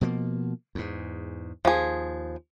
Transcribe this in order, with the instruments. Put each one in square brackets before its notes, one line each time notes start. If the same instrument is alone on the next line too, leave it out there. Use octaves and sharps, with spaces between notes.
[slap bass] B2 F3 A#3
E2 G#2
[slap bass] D#2 [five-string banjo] F3 G#4